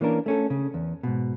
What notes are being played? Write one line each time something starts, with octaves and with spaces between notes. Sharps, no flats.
E3 A#3 C#4 D4 A#4
A3 C#4 A4
C#3
E2
G#2 B2